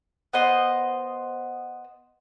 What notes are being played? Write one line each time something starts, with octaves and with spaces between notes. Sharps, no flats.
B3 C5 D#5